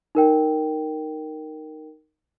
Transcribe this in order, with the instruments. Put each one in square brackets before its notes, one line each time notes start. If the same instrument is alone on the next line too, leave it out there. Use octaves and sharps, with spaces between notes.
[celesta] D#4 A#4 G5